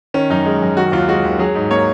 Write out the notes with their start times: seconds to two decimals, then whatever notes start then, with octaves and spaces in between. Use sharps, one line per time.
0.14 D#3 C#4
0.30 F#2 D#4
0.45 G#3
0.62 F#2
0.77 D#3 F#4
0.92 D#2 F4
1.09 G#3 F#4
1.23 D#2
1.39 F#3 G#4
1.55 G#2
1.71 A#3 C#5